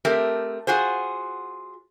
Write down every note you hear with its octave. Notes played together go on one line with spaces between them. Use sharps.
A3 C4 G4 A#4
F4 F#4 G#4 C5